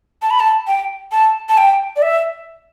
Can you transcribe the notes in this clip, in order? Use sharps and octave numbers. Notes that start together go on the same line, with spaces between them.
A5
B5
A5
G5
A5
A5
G5
D5
E5